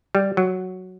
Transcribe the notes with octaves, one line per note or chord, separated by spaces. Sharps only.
G3
F#3